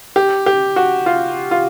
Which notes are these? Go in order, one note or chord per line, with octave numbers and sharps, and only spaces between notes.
G4
G4
F#4
F4
F4